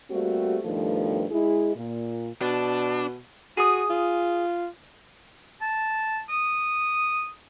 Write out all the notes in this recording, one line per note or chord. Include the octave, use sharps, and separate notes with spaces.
G3 A3 A#3 C4 F#4 G4
G2 B2 D#3 F3 A3
G#3 E4 G#4
A#2
B2 D4
F#4 G#4 D#6
F4
A5
D#6